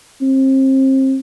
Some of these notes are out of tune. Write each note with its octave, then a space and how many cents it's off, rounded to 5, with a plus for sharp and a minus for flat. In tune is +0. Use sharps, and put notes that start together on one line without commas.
C4 +30